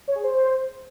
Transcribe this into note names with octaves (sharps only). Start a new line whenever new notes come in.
C#5
G#4
C5